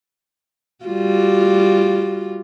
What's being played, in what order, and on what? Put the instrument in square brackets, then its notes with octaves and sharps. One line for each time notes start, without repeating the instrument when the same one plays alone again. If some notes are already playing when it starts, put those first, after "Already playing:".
[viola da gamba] G3 F4 F#4